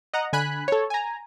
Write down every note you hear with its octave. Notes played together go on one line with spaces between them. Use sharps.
D#5 F#5 A#5
D3 G#5 B5 F#6
A4 C#5
G#5 A#5